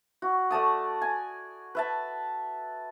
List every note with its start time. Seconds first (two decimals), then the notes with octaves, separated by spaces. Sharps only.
0.22 F#4
0.51 A3 D5 A5 D#6
1.02 G#5
1.75 B4 E5 A5